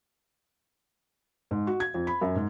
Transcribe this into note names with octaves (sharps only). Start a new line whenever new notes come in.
G#2
F#4
G#6
F2
B5
F#2
G#2